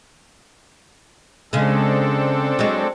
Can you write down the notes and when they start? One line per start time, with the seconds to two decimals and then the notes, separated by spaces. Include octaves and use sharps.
1.53 C#3 G#3 C4 D4 A4
2.59 F#3 G#3